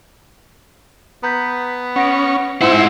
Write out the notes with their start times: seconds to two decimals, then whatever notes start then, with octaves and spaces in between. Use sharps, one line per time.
1.23 B3 A#5 G6 B6
1.96 C#4 F#5 A#6 D7
2.62 G#2 C4 E4 F4 F#5 C6